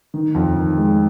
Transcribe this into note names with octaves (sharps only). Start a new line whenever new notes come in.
D#3
F2
D#3
G#3